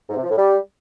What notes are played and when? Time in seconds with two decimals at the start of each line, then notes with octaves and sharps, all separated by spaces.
0.09 G#2
0.16 C3
0.23 F3
0.30 A2
0.37 G3